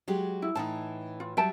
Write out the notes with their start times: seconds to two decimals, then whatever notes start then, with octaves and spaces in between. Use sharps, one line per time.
0.08 F#3 G#3 G4
0.42 E4
0.55 A2 E3 D#4 A5
1.20 F4
1.37 F#3 G3 E5 G5 A5